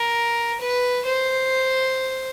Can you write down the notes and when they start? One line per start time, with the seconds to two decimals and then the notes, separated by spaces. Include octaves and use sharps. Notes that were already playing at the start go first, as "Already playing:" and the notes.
Already playing: A#4
0.60 B4
1.05 C5